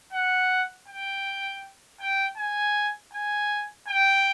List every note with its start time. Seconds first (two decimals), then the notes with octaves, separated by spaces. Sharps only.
0.13 F#5
0.88 G5
2.00 G5
2.38 G#5
3.13 G#5
3.88 G5